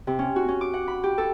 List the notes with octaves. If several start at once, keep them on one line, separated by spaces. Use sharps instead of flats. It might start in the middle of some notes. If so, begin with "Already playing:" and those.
C3
C#4
F#4
C#4
D6
F#5
B5
G4
A4